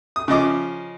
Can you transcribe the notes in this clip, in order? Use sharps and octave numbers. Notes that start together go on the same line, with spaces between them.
D#6
C#3 F3 D#5 D6